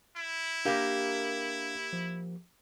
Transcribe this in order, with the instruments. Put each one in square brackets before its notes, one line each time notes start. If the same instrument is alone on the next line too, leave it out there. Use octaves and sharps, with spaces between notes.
[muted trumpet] E4
[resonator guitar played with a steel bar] A#3 G4 [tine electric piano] D4 A#4 F5
[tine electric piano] F3